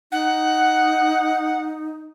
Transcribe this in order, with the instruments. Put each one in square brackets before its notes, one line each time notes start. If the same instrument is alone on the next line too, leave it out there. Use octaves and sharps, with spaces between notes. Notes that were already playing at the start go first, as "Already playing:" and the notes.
[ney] D#4 [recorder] F#5